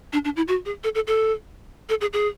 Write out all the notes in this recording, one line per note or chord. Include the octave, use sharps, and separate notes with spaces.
D4
D4
E4
F#4
G#4
A4
A4
A4
A4
G#4
G#4